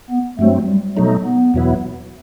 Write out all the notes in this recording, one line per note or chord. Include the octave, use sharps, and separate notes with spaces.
B3
G2 F#3 A3 C4
G3
B2 F#3 A3 D#4
B3
E2 B2 F#3 B3 E4